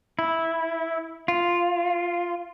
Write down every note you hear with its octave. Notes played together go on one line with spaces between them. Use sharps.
E4
F4